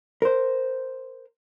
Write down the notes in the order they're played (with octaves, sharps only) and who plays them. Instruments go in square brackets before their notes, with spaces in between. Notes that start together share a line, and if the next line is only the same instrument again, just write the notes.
[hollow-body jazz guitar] A#4 C5